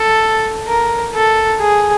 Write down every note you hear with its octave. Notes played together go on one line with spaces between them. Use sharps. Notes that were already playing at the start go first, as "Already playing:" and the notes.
Already playing: A4
A#4
A4
G#4